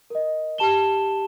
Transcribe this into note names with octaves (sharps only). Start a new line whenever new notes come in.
A#4 D#5
G4 A5 E7 G7